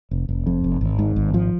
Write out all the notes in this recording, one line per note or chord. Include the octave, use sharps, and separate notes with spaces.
F1
F1
F2
F1
G#1
G#2
G#1
F3